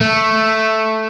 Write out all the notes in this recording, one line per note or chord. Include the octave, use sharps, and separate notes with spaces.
A3